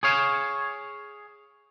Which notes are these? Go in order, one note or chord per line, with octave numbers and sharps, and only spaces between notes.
G#4 C#5 F5